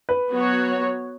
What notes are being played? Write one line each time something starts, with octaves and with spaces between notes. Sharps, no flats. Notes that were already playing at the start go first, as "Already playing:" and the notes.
B4
F#3 B3 F#4 C#5